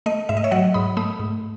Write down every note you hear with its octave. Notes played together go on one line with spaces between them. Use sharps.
A3 D#5
G#2 E5
D#5
C#5 E5
F#3 D#5 F#5
G#2 B5 D#6
A3 B5 D#6
G#2